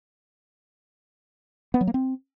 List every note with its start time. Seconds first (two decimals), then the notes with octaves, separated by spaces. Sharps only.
1.74 B3
1.81 F#3
1.87 A#3
1.94 C4